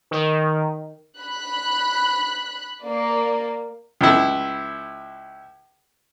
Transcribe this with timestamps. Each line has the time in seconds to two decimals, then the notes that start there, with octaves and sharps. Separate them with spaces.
0.11 D#3
1.19 B5 F#6
2.81 A#3 D5
4.01 C#2 E4